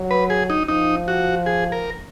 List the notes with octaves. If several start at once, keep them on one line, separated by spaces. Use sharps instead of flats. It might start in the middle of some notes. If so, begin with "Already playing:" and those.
Already playing: F#3
B4
G#4
D#4
F3 D#4
F#4
G#4
A#4